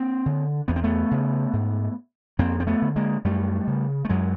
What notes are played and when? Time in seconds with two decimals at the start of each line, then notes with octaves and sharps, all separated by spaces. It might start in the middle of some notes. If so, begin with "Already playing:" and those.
Already playing: A#3 C4
0.26 D3
0.68 E2 B3
0.76 C4
0.84 A3 B3
1.11 C#3
1.53 G#2
2.39 F2 A#3 C4
2.60 C4
2.67 A3 B3
2.82 D3
2.96 G#3 A#3
3.24 F#2 G3 A3
3.67 C#3
4.05 A3
4.09 F#2 F#3 G#3